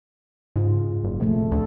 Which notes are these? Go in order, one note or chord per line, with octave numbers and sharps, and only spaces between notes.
G#2 C#3 F4
F#1
A#1 C3 F3 A3
D2 A4